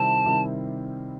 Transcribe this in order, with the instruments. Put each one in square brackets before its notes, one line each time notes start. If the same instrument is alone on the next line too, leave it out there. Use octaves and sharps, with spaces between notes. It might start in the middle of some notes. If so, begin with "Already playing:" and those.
Already playing: [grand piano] C3 D#3 G3 C4 E4 [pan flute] A5
[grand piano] C3 D#3 G3 C4 E4